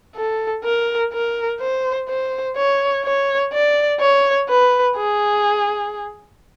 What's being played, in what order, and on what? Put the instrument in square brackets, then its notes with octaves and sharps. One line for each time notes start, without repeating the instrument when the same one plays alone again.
[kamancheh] A4
A#4
A#4
C5
C5
C#5
C#5
D5
C#5
B4
G#4